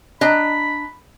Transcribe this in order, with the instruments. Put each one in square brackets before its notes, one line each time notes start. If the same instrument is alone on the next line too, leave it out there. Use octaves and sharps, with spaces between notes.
[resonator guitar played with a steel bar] D4 D#5 A#5 [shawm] B5